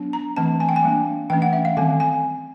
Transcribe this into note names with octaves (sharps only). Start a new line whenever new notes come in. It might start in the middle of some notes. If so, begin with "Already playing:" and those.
Already playing: F#3 B3 D4
A#5
E3 A3 C4 A5
G#5
G5
G#5
G3 A#3 D4
E3 A3 C#4 G5
F#5
E5
F5
D#3 G3 C4 G#5
G#5